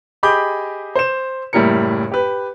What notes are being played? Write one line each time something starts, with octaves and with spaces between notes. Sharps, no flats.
G4 G#4 D#5 B5 D6 G6
C5 E7
F#1 A2 G3 E4 A#4 C#7
G4 B4